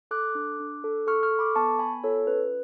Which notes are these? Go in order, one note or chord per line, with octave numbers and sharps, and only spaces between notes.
A4 D6 F#6
D4
D4
A4
A4 C#6 F6
C#6 F6
A4
B5 D6
B3 A5 C#6
B3 G#5 B5
F4 A4 C#5
C#4 B4